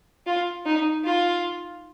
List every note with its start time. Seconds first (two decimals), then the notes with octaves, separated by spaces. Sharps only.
0.26 F4
0.66 D#4
1.04 F4